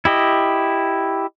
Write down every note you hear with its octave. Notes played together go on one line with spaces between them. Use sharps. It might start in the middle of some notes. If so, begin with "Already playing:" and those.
E4 G4 D#5